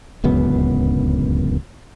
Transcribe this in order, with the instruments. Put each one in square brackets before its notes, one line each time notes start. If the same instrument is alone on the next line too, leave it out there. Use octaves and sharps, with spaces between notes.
[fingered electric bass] D1 C#2 F#2 B3